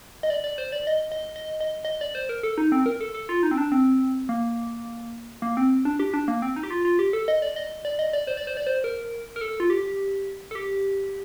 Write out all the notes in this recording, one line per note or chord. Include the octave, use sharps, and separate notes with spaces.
D#5
D5
D5
C5
D5
D#5
D#5
D#5
D#5
D#5
D5
C5
A#4
A4
D#4
C4
A#4
A4
A4
F4
D#4
C4
D4
C4
A#3
A#3
C4
D4
G4
D4
A#3
C4
D#4
G4
F4
F4
G4
A4
D#5
D5
D#5
D5
D#5
D5
C5
D5
C5
D5
C5
A#4
A#4
A4
F4
G4
A4
G4